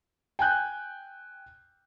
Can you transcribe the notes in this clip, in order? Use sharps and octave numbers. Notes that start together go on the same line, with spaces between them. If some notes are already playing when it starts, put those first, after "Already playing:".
G5 G#5 F#6 G6